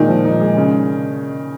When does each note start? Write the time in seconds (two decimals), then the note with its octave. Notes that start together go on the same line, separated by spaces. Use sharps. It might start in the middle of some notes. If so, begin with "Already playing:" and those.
Already playing: A#2 D#3 G#3 D#4
0.09 F3
0.25 D#4
0.40 G#3
0.57 C#3